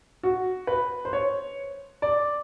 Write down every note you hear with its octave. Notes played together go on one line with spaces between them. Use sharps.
F#4
B4
C5
C#5
D5